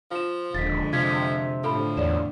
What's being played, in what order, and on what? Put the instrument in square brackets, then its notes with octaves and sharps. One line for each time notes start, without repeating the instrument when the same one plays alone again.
[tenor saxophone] F3 [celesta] F4 E7
[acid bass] D#1 [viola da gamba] F2 D3 G#3 [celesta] A6 B6
[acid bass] C3 [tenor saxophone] F3 [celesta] G#6 B6
[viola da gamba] A2 D3 [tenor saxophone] F3 [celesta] A4 B5
[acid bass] E2 [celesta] C#5 D5 E7